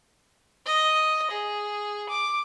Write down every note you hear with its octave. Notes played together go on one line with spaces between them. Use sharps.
D#5
G#4
D6